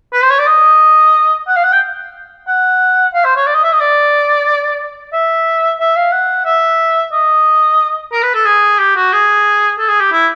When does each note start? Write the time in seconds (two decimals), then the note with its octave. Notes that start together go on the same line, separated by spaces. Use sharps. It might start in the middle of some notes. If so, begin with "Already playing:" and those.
0.13 B4
0.22 C5
0.30 C#5
0.39 D5
0.47 D#5
1.47 F#5
1.56 F5
1.63 F#5
1.72 G5
2.47 F#5
3.14 F5
3.24 C5
3.36 C#5
3.46 D5
3.54 D#5
3.63 E5
3.72 D#5
3.80 D5
5.13 E5
5.80 E5
5.96 F5
6.12 F#5
6.45 E5
7.12 D#5
8.12 A#4
8.22 B4
8.34 A4
8.45 G#4
8.78 G4
8.96 F#4
9.12 G#4
9.78 A4
9.89 G#4
10.00 G4
10.12 E4